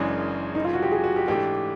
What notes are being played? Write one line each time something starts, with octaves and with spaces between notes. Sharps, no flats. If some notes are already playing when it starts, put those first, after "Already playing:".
Already playing: F#1 F#2 C#3 E3 G#3 D4
D#4
F4
F#4
G4
G#4
F#4
G4
G#2 E3 A3 D4 G4